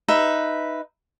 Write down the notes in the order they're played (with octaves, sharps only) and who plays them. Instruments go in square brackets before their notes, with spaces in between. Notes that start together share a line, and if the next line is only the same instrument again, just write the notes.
[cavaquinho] D#4 B4 E5 B5